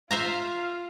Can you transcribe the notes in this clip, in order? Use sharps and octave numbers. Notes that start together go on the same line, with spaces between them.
F4 C5 E5 F5 A#5